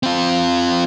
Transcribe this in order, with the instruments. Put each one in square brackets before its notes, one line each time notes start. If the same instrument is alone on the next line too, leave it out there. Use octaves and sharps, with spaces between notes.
[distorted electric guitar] C4 F4